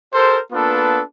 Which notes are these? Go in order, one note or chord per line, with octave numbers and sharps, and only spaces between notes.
G4 A4 A#4 C5
A#3 B3 D4 F4 A4 B4